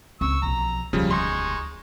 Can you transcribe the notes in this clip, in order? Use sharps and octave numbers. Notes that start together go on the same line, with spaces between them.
C#2 C4 C#6 E6
B1 F3 A#5
E1 D2 C#3 F3 G3
G#3 D#4 C6 C#6